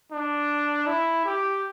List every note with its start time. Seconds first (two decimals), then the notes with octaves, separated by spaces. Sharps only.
0.12 D4
0.87 E4
1.26 G4